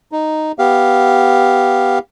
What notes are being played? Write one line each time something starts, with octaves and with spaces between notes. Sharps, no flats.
D#4
B3 G4 F5